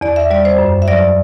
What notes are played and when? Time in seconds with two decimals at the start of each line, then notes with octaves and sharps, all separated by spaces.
0.01 E2 D5
0.16 E5
0.31 G3 D5
0.45 C5
0.58 F#2
0.82 E5
0.88 F#3 D5